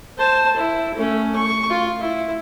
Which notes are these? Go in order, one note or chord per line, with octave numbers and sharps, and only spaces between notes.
C5 A5
E4
A3 C#4
C#6
F4
E4